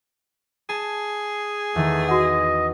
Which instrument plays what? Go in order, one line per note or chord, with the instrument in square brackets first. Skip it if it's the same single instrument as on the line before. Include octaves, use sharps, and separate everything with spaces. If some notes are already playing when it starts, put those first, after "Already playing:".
[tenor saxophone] G#4 [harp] A5
[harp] E2 D#3 [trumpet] A3
[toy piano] F#4 F#5 [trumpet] D#5